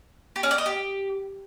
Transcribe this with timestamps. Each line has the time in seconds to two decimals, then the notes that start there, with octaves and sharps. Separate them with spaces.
0.36 G4
0.43 C#4
0.51 D5
0.58 D#5
0.66 G4